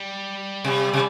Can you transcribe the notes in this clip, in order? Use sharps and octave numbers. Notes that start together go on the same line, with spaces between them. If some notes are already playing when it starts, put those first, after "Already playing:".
Already playing: G3
C3
C3